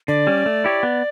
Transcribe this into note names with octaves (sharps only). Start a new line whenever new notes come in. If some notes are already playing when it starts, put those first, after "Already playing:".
D3 D5
G3 C#4
A3
E4 G4 C#5
B3